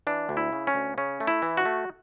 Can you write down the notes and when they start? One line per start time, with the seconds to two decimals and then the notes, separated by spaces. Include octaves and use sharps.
0.07 E3 D4
0.29 D2
0.37 E4
0.53 C#3
0.67 C#4
0.75 D2
0.98 C#3 C#4
1.20 A3
1.27 E4
1.42 E3
1.57 F#4
1.65 A3